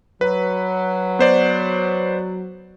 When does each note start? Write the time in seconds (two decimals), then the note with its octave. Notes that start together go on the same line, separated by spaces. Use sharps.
0.21 F#3 B4
1.19 B3 C5 D5